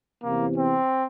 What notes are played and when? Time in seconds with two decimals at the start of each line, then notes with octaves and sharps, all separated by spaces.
0.22 E2 C3 E3 A#3
0.57 C4